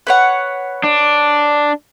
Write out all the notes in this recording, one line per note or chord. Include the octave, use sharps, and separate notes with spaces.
B4 C#5 F#5
D4